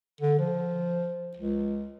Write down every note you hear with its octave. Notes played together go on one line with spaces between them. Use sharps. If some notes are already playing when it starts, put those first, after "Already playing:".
D3
F3
C#2